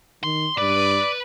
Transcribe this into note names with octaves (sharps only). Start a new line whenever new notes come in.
D#3 C6
G2 B4 D5